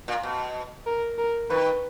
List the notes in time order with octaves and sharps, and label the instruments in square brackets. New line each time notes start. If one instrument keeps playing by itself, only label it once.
[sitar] A#2
B2
[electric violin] A#4
A#4
[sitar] D#3 [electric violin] B4